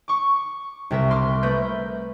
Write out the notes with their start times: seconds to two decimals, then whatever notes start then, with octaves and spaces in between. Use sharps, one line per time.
0.08 C#6 D6
0.91 C2 C3 A#4 E5
1.11 C6 D6 F6
1.43 A3 A#4 B4 G6